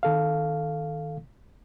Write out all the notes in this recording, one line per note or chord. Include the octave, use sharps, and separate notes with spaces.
D#3 A4 F5